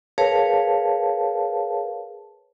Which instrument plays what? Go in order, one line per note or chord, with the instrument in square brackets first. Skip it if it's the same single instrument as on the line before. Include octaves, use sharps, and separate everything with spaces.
[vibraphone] G#4 A#4 B4 C#5 F5 A5